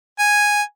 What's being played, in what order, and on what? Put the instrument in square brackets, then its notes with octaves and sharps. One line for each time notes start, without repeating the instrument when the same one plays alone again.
[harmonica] G#5